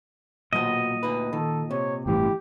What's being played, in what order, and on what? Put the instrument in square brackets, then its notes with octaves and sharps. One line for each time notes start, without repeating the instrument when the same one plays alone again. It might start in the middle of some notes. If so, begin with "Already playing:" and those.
[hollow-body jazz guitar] B1 F#3 C5 [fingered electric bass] A#2 [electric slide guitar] D#5
[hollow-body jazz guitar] D2 D#4 B4
[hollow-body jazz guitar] D#3 [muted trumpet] A4
[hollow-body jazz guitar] C3 [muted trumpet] C#5
[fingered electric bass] G1 A2 E3 [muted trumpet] G4